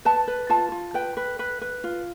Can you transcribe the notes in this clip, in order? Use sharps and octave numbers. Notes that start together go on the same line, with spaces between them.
B4 A5
B4
F4 A5
F4
B4 G5
B4
B4
B4
F4